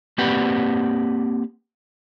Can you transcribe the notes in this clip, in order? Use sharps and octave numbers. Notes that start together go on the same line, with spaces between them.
A#3 C4 G4 B4 D5 F#5